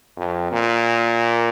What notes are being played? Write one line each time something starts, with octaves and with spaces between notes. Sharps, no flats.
F2
A#2